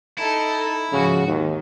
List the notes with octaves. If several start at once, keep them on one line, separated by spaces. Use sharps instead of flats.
D#4 E4 A4
G#2 C#3 F3 F#4
D#2 D#3